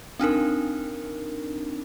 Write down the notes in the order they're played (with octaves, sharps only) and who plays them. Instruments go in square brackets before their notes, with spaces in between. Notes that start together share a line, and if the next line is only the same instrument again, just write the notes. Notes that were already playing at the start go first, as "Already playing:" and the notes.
[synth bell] C4 D4 D#4 A#4